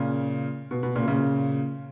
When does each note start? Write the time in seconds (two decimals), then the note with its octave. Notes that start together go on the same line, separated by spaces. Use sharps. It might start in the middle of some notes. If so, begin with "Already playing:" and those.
Already playing: A#2 C#3
0.71 B2
0.83 B2
0.95 A#2 C#3
1.08 A#2 C#3